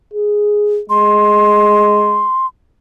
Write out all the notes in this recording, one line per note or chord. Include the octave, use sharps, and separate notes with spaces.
G#4
G#3 C6